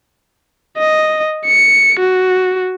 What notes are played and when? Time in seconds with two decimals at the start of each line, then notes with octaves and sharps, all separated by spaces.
0.78 D#5
1.46 C#7
2.00 F#4